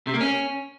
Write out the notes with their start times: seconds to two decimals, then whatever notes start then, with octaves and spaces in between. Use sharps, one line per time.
0.07 C3
0.14 A#3
0.21 C#4